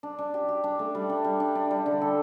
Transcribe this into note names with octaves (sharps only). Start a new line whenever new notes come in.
D4
D4
G4
G4
D4
A3
G3
D4
G3
D4
D4
G3
D3
A4